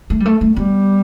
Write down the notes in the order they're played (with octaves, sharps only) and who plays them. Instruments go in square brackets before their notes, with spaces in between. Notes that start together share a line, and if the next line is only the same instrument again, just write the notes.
[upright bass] A3
G3
A3
A3
[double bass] G3 [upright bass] B3